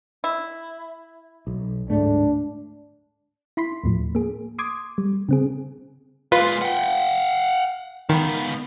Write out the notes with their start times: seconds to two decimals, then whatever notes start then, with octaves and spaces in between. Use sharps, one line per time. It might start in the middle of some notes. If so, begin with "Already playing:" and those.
0.24 E4
1.47 B1
1.90 D1 G#2 A3 D4
3.57 E4 B5 C6 B6
3.84 D#2 A2 F3
4.15 A#3 G#4
4.59 C6 D6 D#6 G#6
4.98 G3
5.29 C#3 C4 G#4
6.32 G#3 A#3 F4 B4 B5
6.62 F#5 G5
8.09 C#2 D#3 B3